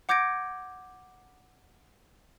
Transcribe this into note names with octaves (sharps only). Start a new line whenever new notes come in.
F#5 D6 G6 G#6 A#6 D7